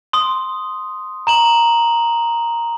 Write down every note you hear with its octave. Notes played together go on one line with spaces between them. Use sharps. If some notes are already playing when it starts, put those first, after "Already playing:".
C6 D#6
A#5 E7 F#7